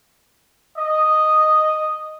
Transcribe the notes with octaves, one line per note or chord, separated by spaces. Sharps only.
D#5